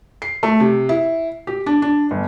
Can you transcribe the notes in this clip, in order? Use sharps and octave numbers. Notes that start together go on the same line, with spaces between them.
C7
A3
C3
E4
G4
D4
D4
G1